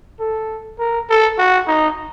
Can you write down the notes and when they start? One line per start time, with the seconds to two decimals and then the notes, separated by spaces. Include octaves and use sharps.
0.20 A4
0.79 A#4
1.09 A4
1.39 F#4
1.67 D#4